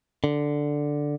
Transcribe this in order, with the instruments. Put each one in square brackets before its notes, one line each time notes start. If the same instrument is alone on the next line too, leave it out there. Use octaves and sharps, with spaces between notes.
[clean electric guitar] D3